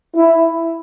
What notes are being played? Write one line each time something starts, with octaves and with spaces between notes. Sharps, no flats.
E4